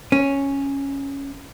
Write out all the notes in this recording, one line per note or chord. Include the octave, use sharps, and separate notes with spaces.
C#4